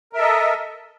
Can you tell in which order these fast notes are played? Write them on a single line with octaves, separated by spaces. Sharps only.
A#4 E5 A4 D#5